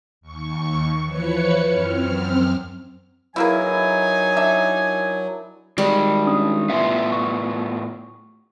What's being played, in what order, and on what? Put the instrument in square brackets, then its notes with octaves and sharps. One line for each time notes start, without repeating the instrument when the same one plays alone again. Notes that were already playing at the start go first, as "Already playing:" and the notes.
[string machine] D#2 C#6
E3 F3 B4 C#5 C#7
F#2 C4 F6
[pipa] E3 A#3 G#4 [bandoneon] F#3 [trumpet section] D#4 G#5 [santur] E4 A#4
[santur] D4 [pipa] E5
[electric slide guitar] D#3 G#3 [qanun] G3
[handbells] C#4 D4 D#6
[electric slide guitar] A2 B3 F4 [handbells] E5 C6
[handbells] C#6